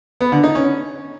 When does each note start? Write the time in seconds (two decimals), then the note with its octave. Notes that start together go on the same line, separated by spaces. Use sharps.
0.21 B3
0.32 D3
0.43 D#4
0.55 C#4